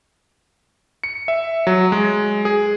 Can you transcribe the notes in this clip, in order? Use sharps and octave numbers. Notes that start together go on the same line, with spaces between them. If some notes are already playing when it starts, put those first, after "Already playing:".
C#7
E5
F#3
G#3
G#4